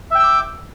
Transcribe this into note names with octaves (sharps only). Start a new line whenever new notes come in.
E5 G5 D6 E6